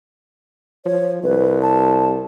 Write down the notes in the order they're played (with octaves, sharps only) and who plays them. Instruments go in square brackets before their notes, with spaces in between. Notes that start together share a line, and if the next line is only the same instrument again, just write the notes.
[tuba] F3 [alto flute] C#5
[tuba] C2 [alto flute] B4
[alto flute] A5